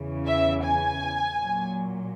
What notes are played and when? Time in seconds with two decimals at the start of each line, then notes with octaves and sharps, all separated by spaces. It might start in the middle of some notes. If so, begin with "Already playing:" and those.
Already playing: E2 C#3 E3
0.26 E5
0.63 G#5
1.35 A#2 F#3